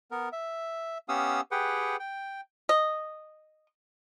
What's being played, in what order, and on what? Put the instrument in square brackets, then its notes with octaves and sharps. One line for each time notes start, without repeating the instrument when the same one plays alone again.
[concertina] B3 A#4
E5
B3 C#4 G4 F5 D#6 E6
G4 G#4 B4 F#5 G5
G5
[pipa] D#5